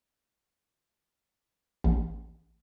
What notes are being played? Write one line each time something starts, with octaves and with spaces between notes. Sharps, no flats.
A1